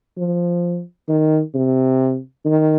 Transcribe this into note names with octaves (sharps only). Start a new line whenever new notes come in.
F3
D#3
C3
D#3